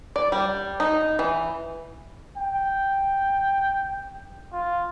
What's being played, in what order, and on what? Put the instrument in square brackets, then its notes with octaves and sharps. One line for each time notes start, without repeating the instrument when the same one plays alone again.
[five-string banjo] D5
G3
D#4
E3
[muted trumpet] G5
F4